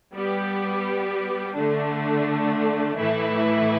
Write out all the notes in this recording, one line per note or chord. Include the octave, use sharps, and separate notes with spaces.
G3 B3 G4
D3 A3 D4
A2 E3 A3 E4 B4